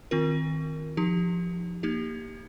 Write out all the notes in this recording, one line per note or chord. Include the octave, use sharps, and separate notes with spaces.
D#3 C4 F4 A#4
F3 D#4 G4
A#3 D#4 G4